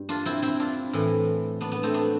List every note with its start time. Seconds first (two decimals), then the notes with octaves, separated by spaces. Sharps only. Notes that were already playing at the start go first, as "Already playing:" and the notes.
Already playing: G2
0.09 D4 F4
0.25 C4 E4
0.42 C4 E4
0.60 D4 F4
0.93 A2 E3
1.61 B3 D4
1.72 B3
1.83 A3 C4
1.94 B3 D4